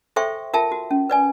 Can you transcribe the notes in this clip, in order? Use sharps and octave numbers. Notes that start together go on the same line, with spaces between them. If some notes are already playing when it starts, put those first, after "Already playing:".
A4 C5 E5 G5 C6 C#6
F4 A#4 E5 G5 A5
F#4
C#4
B4 D5 G#5